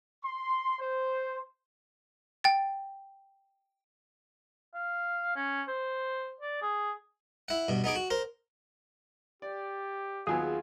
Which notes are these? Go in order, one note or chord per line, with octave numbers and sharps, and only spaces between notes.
C6
C5
G5 A6
F5
C#4
C5
D5
G#4
E4 F#5
G2 B2
B3 D#4 G#4 D6
F#4
A#4 C5
G4 D5
D#2 F#3 B3 F4 G#4